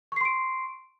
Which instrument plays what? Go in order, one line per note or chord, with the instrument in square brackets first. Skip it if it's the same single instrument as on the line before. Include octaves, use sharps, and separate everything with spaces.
[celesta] C#6
C7
C6
D7